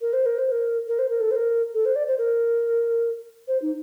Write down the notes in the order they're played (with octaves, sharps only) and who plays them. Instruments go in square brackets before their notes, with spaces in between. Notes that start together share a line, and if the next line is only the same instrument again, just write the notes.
[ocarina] A#4
C5
A#4
C5
A#4
A#4
C5
A#4
A4
C5
A#4
A4
C5
D5
C5
A#4
C5
D#4